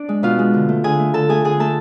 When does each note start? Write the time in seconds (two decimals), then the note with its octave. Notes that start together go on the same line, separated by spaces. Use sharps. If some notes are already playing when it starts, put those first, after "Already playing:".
Already playing: D4 D5
0.09 G#3
0.23 B2 F4 F5
0.39 G#3
0.54 D3
0.69 A3
0.84 D3 G#4 G#5
0.99 A3
1.14 D3 A4 A5
1.29 A3 G#4 G#5
1.44 D3 G#4 G#5
1.59 A3 A4 A5